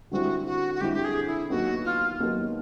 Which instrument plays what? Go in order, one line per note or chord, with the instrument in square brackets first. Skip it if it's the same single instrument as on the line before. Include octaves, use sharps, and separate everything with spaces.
[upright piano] D3 G3 C4 E4 [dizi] F#4
[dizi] F#4
F#4
[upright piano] D3 G3 C4 E4 [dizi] G4
[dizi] G4
G#4
E4
[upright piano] D#2 D#3 F#3 B3 [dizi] F#4
[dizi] F4
[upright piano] D#2 D#3 F#3 B3